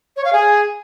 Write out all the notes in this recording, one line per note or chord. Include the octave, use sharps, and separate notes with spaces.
C#5
F5
G#4